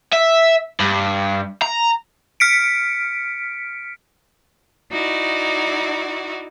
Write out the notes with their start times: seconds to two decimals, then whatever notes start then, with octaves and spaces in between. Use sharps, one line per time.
0.12 E5
0.80 G2
1.62 A#5
2.40 F6 B6 C#7 D7
4.92 D#4 E4 F#4 D5